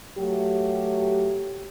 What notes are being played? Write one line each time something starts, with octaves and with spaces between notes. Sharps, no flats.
F#3 A3 G4